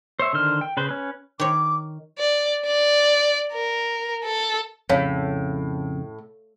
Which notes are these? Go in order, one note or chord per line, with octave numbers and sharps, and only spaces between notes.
C5 C#5 E5
D3 D#3 C5 F6
G5
C#3 B4 C5
C#4 B4
D#3 C#5 D6
D5
D5
A#4
A4
F2 A2 C#3 C#5 F5